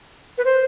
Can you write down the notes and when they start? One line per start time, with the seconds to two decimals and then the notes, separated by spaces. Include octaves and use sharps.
0.38 B4
0.45 C5